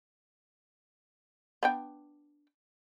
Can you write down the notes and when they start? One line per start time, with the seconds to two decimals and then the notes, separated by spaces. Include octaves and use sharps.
1.63 B3 D4 G5